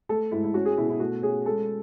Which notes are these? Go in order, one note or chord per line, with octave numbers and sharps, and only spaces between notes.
A3 A4
G#2 E4
E4
C#4 F#4
G#4
B2 E4
E4
A3 F#4
C#4 G#4
G#3 A4